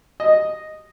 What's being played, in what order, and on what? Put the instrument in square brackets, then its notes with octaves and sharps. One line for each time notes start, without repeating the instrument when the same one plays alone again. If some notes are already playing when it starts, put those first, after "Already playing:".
[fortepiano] D#5